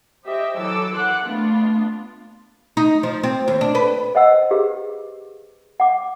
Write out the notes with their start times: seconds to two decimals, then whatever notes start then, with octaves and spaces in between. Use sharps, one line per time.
0.24 G4 C5 D#5 E5 G5
0.58 E3 F#3 A4 D6 E6
0.95 F#5 C6 D6 F#6
1.24 A3 B3 D4 F4
2.77 D#4
3.03 F3
3.23 C4
3.48 D#2
3.61 D4
3.75 B4
4.15 C5 D#5 F#5 E6
4.51 G4 G#4 B4
5.80 F#5 D6